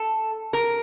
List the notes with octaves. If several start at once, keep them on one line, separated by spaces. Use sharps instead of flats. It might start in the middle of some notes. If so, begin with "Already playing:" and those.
Already playing: A4
A#4